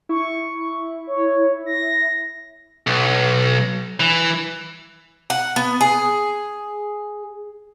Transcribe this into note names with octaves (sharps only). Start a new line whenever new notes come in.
E4 C#6
C#5
A#6
B1
E3
F#5
B3
G#4